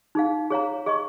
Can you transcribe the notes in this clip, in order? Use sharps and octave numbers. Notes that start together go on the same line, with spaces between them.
D#4 G#4 F5
G#4 C#5 F5 A#5
G#4 D#5 C#6